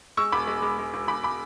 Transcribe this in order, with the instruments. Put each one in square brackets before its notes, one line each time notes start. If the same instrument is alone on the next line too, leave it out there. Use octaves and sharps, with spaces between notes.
[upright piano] G#3 C#6 E6
E1 B5 D6
G#3
G#3
G#3
E1
E1 B5 D6
B5 D6